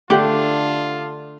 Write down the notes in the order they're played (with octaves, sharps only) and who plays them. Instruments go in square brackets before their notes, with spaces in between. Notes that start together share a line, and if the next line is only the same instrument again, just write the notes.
[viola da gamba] D3 D4 [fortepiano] A3 [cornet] F4 [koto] G4 F#5